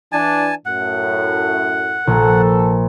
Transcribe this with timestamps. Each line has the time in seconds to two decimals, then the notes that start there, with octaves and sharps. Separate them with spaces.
0.12 E3 D4 G#5 A5
0.66 F#2 A2 F#5
2.07 A#1 A4